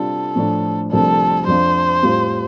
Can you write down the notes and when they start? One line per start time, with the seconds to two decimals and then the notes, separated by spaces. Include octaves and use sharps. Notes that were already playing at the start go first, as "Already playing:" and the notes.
Already playing: C3 G3 D4 F4 A4
0.35 A2 F3 A3 D4
0.91 C2 C3 F3 A3 D4 A4
1.47 F2 F3 D4 F4 C5
2.03 A2 G3 C4 F4